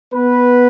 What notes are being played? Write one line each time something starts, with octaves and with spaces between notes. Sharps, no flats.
B3 B4